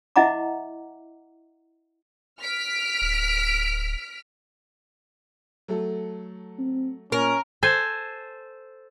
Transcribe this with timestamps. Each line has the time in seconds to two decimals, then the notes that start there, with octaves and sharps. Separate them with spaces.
0.16 E4 D#5 E5 F#5 A#5 D6
2.40 F6 B6 D7
3.02 D1
5.68 F#3 A3 A4
6.59 C4
7.12 A#2 C#4 A#4
7.63 A4 C5 G#5